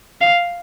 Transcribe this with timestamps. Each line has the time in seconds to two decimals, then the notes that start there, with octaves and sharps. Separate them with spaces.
0.21 F5